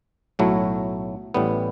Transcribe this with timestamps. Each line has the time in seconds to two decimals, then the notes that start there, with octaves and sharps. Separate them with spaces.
0.39 B1 A2 F#3 A3 E4
1.34 A1 A2 G3 B3